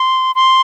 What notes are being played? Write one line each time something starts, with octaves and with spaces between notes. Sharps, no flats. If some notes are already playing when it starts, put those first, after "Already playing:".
Already playing: C6
C6